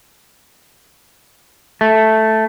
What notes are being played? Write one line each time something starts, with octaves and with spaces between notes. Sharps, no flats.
A3